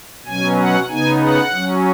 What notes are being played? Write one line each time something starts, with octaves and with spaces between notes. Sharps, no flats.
B2 F#3 C#4 G#5
F#5
C#3 B3 D#4 G#5
F#5
F#3 C#4